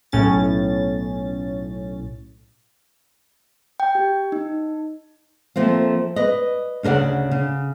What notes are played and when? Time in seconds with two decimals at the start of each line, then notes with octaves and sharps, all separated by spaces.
0.12 B1 A2 C#4 A6
3.80 G5
3.95 G4
4.32 D#4
5.56 F3 A3 A#3 C4
6.16 B4 D5 D#5
6.83 D2 C#3 A#4 D5 F#5
7.31 C#3